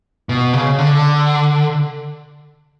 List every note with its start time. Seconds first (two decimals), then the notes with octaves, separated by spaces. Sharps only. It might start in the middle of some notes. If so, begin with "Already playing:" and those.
0.29 B2
0.53 C#3
0.78 D3